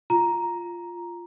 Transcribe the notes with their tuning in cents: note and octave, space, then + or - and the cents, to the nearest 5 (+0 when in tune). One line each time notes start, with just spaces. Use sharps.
F4 -5 A#5 +5